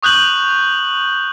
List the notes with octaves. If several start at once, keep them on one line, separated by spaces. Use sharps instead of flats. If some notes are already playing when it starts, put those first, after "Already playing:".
C#6 D#6 F#6 G6 F#7